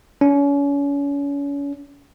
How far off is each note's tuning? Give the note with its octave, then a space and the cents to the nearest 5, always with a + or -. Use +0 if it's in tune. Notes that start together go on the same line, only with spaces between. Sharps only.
C#4 +35